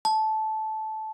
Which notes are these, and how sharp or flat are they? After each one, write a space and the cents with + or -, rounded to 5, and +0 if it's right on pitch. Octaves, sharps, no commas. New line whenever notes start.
A5 -15